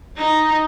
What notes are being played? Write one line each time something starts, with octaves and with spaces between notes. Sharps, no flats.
D#4